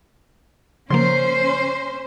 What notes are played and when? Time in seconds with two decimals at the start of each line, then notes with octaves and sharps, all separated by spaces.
0.90 C#3 F3 A#3 C#4 C5 C6